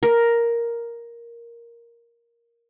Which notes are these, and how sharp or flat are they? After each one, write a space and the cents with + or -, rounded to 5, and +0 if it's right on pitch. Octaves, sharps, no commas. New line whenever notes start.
A#4 +5